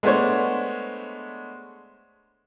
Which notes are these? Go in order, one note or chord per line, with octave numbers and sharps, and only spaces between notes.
G#3 A3 B3 D4 C5 C#5